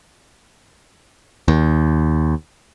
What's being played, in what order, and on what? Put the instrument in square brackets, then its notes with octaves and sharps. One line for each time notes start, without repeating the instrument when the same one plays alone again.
[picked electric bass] D#2